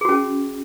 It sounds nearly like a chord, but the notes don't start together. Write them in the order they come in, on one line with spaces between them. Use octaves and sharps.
G#4 F#4 C#4